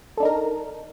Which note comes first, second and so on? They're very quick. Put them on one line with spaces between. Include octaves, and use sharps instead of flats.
A4 D4 D#4 A#4